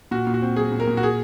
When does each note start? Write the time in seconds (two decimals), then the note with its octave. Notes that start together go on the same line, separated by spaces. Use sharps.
0.11 A#2 F#4
0.27 A#2
0.34 F#4
0.42 C4
0.56 F#3 G#4
0.72 A#2
0.80 A#4
0.88 A#2
0.97 F#4
1.03 G#4